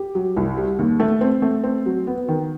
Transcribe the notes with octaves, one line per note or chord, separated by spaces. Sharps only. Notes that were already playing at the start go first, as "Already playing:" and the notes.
Already playing: G4
F#3
C2
G3
D#2
A3
C4
A3
C4
F#3
B3
D#3